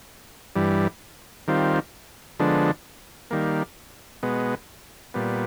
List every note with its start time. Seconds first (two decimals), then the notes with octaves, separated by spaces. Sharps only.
0.55 G2 E3 G3
1.48 D#3 G3 C4 F4
2.39 D3 F3 G#3 B3 D4
3.31 D#3 G3 A#3
4.23 B2 G#3 B3
5.14 A#2 G3 B3